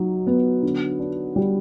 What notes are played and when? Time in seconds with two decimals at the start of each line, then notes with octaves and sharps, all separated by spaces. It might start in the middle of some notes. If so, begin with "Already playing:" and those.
Already playing: F#3 D#4
0.27 B3
0.63 D3
0.99 D4
1.36 G3